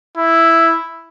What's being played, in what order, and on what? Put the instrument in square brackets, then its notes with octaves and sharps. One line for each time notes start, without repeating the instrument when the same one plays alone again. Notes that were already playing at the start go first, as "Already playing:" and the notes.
[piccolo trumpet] E4